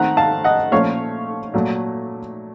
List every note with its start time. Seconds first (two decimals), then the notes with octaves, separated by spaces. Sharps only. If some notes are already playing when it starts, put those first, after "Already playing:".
Already playing: D#3 A3 C4 F#5 A#5
0.17 F5 A5
0.44 D#5 F#5
0.72 A#2 F3 A3 C#4 C#5 F5
1.54 A#2 F#3 A3